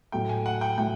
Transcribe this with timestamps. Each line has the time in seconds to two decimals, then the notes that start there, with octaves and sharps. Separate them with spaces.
0.12 A2 F#3 A3 G5
0.29 G#5
0.46 F#5
0.61 G5
0.78 A2 F#3 A3 G5